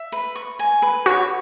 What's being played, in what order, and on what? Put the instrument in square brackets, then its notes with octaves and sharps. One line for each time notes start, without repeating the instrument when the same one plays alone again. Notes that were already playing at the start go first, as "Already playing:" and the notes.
Already playing: [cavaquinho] E5
B4
C#6
G#5
B4
[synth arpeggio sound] F#4 [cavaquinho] C#5